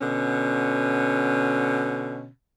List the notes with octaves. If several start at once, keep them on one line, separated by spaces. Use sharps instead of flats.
B2 D3 C#4